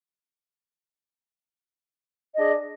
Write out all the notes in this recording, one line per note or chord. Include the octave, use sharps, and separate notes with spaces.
D4 G#4 D#5